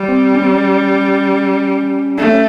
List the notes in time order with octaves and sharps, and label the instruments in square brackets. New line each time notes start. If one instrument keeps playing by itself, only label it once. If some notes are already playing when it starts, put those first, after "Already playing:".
Already playing: [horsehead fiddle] G3
[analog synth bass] C4
C#4
C4
C#4
[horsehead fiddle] A3 [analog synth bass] D4
[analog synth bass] C#4